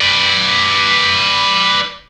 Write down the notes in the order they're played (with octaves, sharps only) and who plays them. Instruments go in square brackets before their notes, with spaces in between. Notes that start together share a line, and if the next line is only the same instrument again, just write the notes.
[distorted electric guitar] B4 D5